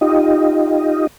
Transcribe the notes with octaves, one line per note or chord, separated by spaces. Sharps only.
D#4 F4 G4 D#5